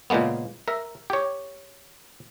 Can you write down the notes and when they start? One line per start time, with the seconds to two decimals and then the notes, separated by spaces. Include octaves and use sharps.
0.10 A#2 C#3 G#3 A#3 B3
0.68 A#4 E5
1.10 G4 C#5